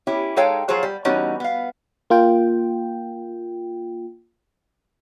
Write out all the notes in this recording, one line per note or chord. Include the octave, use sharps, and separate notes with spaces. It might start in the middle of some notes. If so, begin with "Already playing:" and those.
C#4 E4 G4
G#3 D#4 A4 C#5 F5 G5
F3 F#3 F4 G#4 C5 C#5
G3
E3 G3 B3 C#4 D#4 F#4
B3 F5
A#3 F4 G5